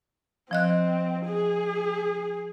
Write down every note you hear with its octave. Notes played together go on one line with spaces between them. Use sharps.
F3 C4 D#5 F#6
G#4